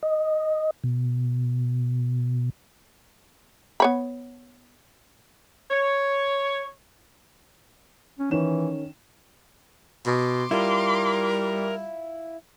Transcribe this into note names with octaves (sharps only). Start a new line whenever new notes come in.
D#5
B2
B3 C#5 B5
C#5
C#4
D#3 E3 C#4 E7
B2 C6 D6
G3 E4 F4 A#4